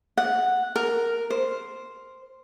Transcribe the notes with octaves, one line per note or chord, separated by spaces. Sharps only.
F#5
A#4
C5